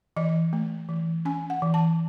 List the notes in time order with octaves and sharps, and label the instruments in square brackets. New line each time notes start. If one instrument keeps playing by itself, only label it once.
[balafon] E3 D#5
A3
E3
C#4 G#5
F#5
E3
A5